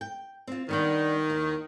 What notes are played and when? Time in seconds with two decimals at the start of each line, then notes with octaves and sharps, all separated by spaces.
0.01 G5
0.47 C4 F4
0.69 D#3 G3 B3 D4
1.30 D#2